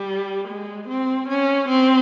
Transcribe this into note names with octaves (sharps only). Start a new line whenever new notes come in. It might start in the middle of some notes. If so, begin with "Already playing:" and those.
Already playing: G3
G#3
C4
C#4
C4